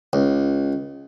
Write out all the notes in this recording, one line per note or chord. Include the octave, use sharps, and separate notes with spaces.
C#2